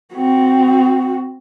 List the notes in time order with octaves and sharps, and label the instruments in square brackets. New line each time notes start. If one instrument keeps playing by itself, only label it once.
[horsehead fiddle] C4 F#4